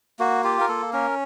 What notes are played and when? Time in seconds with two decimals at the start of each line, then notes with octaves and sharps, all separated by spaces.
0.19 A#3 F#4
0.44 F4 G4
0.60 A#4
0.68 A#3 A4
0.93 C#4 A#4